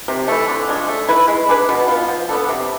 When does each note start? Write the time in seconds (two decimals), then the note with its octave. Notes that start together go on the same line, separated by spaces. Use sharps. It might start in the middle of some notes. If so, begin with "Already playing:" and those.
0.08 C3
0.28 E3 A3
0.48 D3
0.68 F3 G#3 D4
0.88 A3
1.08 E4 B4
1.28 G#3
1.49 D4 G#4 B4
1.69 B2
1.88 B3 F4
2.08 F3
2.29 B3 D4 A4
2.49 C3